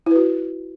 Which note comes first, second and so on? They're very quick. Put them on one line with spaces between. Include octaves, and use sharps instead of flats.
E4 B4 F#4